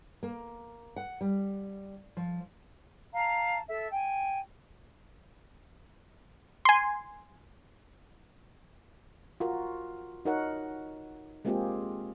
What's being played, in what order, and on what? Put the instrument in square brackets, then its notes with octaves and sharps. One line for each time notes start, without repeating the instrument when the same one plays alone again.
[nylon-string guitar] A#3
F#5
G3
F3
[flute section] F5 A5 A#5
A4 E5
G5 G#5
[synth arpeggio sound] G#5 C6
[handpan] F4 F#4 A#4
D#4 F#4 A#4 C#5 F#5
G#3 A#3 C4 F4 G4 G#4